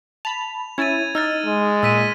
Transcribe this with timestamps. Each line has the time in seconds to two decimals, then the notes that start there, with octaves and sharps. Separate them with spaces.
0.25 A5 B5 F7
0.78 C#4 E4 G#6 A6 D#7
1.15 D#4 E6 F6 A6
1.46 G#3
1.83 A#2 E6 B6 D#7